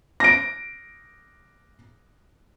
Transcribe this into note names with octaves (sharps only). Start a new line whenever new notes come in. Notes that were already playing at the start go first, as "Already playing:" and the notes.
A#6 D7